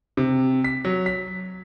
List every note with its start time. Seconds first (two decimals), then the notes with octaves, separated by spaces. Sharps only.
0.17 C3
0.64 B6
0.85 F#3
1.06 B6